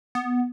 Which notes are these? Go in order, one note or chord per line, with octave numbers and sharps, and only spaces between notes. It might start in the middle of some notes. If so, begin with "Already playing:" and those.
B3